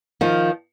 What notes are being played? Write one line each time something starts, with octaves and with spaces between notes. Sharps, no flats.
D#3 F3